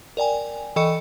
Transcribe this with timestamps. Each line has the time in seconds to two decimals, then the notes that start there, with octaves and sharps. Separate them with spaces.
0.17 A#4 D5 G5 G#5
0.76 E3 A4 D#5 G5 C#6 C#7